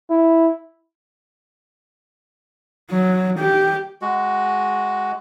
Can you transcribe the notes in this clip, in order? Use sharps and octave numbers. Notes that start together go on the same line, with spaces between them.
E4
F#3
G4
G#3 F#4